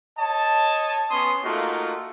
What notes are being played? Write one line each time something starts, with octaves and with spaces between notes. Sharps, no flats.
C#5 D#5 A5
B3 C#4 C6 D#6
A3 A#3 D#4 F4 F#4